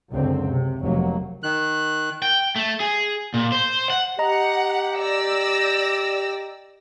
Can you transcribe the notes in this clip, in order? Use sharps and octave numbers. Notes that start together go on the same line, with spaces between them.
C#2 F#2 D3 C4
C3
F1 F#3 A#3
D#3 F#6
G5
A3
G#4
A#2
C5
F#5
G4 D#5 F#5 A#5
D5 E6 A#6